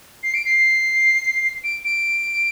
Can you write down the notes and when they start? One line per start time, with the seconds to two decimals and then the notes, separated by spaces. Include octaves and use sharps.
0.23 C7
0.34 D7
0.45 C7
1.63 D7
1.84 D7